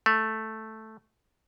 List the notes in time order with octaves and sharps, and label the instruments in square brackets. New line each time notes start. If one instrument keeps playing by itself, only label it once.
[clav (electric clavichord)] A3